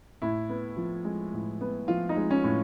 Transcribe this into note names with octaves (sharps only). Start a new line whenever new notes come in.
A2 E4
B3
F3
G#3
A2
B3
F3 F4
D#4
G#3
C#4
A2